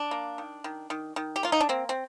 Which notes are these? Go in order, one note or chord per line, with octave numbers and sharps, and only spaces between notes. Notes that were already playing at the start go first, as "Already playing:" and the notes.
Already playing: D4
A#3
D#3
D#3
D#3
D#3
G4
A#3 F4
D#4
D4
A#3 C4
C4